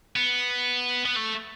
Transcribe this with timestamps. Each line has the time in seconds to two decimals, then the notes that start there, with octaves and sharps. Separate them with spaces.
0.16 B3
1.05 B3
1.16 A3